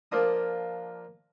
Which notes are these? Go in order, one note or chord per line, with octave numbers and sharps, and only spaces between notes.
F3 A#3 D4 D#6